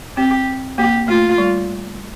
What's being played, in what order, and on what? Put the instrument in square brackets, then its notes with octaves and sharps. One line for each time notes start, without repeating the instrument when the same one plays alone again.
[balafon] C4 [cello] G4
[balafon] A#3 [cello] G4
[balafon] A3 [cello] F4
[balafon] G3